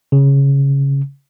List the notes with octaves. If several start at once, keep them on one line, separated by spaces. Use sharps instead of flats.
C#3